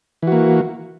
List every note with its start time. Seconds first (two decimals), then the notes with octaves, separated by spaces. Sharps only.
0.22 E3
0.27 F#4
0.32 A#3